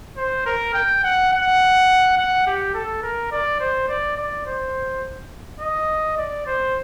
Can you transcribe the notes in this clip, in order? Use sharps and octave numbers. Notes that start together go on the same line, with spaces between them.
C5
A#4
G5
F#5
F#5
F#5
G4
A4
A#4
D5
C5
D5
D5
C5
D#5
D5
C5